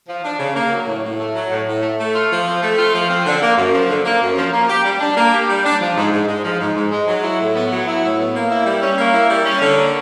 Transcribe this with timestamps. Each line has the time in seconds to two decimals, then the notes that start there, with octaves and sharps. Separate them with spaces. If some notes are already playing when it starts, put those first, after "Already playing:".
0.09 F3
0.24 D4
0.39 C#3
0.56 A#3
0.72 F#3
0.87 A2
1.04 A2
1.20 A3
1.35 F#3
1.51 A2
1.67 A2
1.82 A3
1.99 A3
2.15 F4
2.31 F3
2.47 C4
2.63 A3
2.78 F4
2.95 F3
3.10 C4
3.26 D3
3.42 A#3
3.58 F#2
3.74 F3
3.89 D3
4.05 A#3
4.22 F#2
4.37 F3
4.53 A#3
4.69 G4
4.85 G3
5.00 D4
5.17 A#3
5.33 G4
5.48 G3
5.65 D4
5.80 F3
5.97 G#2
6.12 G#2
6.28 G#3
6.44 F3
6.60 G#2
6.75 G#2
6.92 G#3
7.08 F#3
7.23 E4
7.40 A2
7.55 B3
7.71 F#3
7.87 E4
8.04 A2
8.19 B3
8.35 A#3
8.50 E4
8.66 G3
8.83 C#4
8.98 A#3
9.14 E4
9.30 G3
9.46 C#4
9.62 D3
9.78 A#3